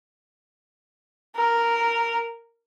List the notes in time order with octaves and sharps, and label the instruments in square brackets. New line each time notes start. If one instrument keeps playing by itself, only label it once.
[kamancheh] A#4